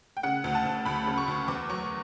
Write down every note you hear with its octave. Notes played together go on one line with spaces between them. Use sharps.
G5
C#3 F#5
D2
A5
D2
D2 B5
C#3
C#6
D2
E2 D6
F#3 C#6